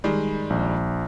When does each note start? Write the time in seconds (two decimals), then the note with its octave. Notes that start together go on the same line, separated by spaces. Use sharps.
0.04 D#3 G3 G#3
0.50 A#1